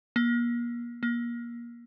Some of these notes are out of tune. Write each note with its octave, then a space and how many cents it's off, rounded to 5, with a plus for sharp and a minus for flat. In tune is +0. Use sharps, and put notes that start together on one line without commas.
A#3 +40
A#3 +30